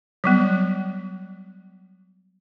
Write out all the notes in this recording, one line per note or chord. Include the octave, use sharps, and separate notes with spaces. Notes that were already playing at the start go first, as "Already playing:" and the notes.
F#3 G3 B3